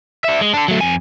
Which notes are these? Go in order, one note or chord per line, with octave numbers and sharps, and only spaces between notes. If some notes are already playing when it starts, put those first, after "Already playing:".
D4 E5
G#3
D4 A4
F#3 A3
F2 G#5